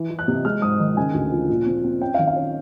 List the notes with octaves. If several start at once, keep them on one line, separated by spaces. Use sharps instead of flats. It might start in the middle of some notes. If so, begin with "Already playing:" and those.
Already playing: E3
E3
F#6
C3
G#3 F6
G#2 D#6
D#3
C#3 G#5
D2
F3
A#2
C4
C4
C#4 G5
F5
D#3
F5
C#4